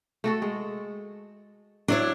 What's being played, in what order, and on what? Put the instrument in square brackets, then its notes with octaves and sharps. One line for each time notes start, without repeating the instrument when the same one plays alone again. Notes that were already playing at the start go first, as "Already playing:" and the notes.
[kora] A3 F#4 A4
G#3
[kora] F#3 D5 [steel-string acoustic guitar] D4 E4 C#5